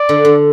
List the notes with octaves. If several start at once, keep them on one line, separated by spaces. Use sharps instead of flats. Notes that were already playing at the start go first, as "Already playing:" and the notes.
Already playing: D5
D3
D3